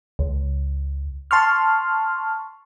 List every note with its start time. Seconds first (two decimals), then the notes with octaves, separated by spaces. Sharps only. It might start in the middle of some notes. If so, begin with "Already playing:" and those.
0.19 C#2
1.31 A5 C6 C#6 F6